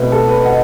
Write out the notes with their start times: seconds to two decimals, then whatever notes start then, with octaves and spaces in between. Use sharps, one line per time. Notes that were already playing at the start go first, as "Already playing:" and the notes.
Already playing: B2 A3 C4 B4
0.12 A4
0.28 B4
0.45 D#5 F#5